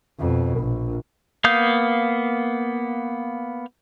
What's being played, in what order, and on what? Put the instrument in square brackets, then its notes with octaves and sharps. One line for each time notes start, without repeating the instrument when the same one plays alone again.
[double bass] F2 B2
A#1
[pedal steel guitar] A#3 B3 F5 D#6 G6